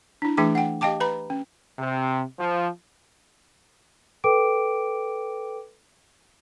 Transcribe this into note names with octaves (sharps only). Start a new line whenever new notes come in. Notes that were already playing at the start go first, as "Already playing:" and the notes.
D4 E4
E3 A3 D4 G#4 G5 D6
F#5 G5
G4 D#5 F5 G5 A5 D6
B4 A#5 B5
C#4
C3
F3
A4 B4 G5 D6 D7